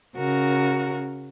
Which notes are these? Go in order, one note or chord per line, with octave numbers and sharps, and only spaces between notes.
C#3 F#4 A#4